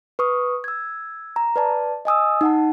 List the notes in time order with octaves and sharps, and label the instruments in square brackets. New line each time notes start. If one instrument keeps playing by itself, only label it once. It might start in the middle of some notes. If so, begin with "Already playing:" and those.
[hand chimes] B4 C#6 D#6
E6 G#6
A#5
B4 D5 A5
D#5 G#5 D#6 E6
D#4 F#5 A5